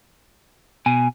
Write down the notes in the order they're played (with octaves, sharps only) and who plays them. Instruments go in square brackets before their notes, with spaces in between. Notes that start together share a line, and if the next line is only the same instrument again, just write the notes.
[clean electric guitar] B2 [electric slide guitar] G#5